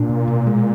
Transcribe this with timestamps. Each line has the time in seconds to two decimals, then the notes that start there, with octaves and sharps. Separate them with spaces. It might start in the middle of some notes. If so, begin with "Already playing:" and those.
Already playing: A#2 D4
0.09 B2
0.28 B2
0.47 G#3